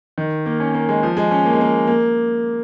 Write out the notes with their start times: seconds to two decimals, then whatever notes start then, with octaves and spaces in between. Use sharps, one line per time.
0.18 D#3
0.46 A#3
0.60 C#4
0.74 A#3
0.89 G#3
1.03 F3
1.17 G#3
1.31 C#4
1.45 A#3
1.53 G#3
1.61 A#3
1.87 A#3